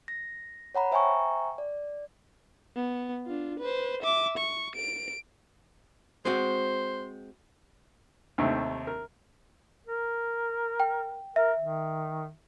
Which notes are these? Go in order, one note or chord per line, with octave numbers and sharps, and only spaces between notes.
A#6
C#5 F#5 A#5 B5
C5 E5 G5 G#5 A#5 C#6
D5
B3
D4 F4
B4 C5
E5 D6
C#6
D7
G#3 C4 F#4 C5
D#2 C3 D#3 A3
A#4
A#4
G5
A#4 E5
D#3